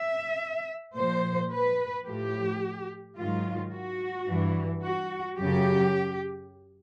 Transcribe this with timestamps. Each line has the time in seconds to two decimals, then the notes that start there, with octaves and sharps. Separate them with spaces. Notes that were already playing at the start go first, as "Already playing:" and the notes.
Already playing: E5
0.96 A#2 F3 C5
1.51 B4
2.06 A2 F3 G4
3.17 G#2 D#3 F#3 F4
3.73 F#4
4.28 G2 E3
4.82 F#4
5.38 F#2 C#3 F#3 G4